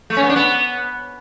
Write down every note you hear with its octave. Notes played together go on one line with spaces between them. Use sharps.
A3
C#4
B3
D4
B3